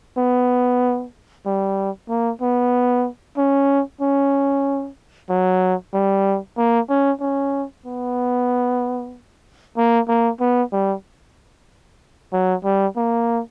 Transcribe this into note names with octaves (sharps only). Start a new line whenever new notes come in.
B3
G3
A#3
B3
C#4
C#4
F#3
G3
A#3
C#4
C#4
B3
A#3
A#3
B3
G3
F#3
G3
A#3